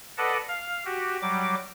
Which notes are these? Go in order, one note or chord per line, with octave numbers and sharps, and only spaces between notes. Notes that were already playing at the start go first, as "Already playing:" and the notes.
A4 B4 D5 D#5 F#5 A5
F5
F#4 G4
F#3 G3 D6